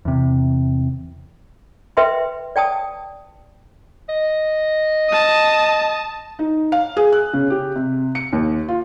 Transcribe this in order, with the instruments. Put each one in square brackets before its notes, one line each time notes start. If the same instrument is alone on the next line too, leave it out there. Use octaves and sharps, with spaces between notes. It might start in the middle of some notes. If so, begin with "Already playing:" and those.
[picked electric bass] E2 C3
[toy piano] B4 E5 G5 C6
D5 G5 A5 D#6
[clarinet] D#5
[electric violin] A5 D#6
[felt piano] D#4
F5
G#4
F#6
C#3
G4
C3
C#7
D#2
F4